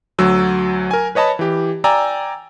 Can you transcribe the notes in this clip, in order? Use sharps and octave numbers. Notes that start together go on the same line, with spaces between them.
D2 F#3 E6
A#4 G#5
B4 C#5 D#5 A5 B5
E3 G4
D5 G5 G#5 A#5 E6